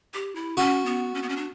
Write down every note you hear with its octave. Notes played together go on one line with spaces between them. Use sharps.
G4
E4
C#4 F#4
B3
C#4
B3
C#4
D4